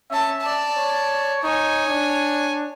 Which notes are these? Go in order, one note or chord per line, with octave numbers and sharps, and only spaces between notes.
C#4 E5 A5
D5 A5
C#5
D#4 C#5 G#5
D4